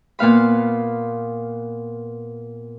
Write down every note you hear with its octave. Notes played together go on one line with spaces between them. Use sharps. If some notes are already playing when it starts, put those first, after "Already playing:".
A#2 B3 F5 B5